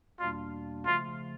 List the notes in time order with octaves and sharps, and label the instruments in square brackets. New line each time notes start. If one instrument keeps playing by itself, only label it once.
[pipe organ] E2 B2 G3 A#3 D4 [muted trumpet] F4
[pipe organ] C#3 F3 A3 [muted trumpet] F4